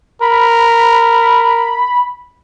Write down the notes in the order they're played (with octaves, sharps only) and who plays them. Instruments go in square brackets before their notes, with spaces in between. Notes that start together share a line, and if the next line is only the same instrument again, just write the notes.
[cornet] A#4 [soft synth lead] B5